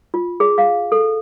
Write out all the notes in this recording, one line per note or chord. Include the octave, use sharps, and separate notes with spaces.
F4
G#4
F5
A4